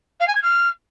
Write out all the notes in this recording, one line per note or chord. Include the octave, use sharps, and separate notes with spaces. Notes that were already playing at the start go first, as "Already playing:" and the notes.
F5
G#5
G#6
F6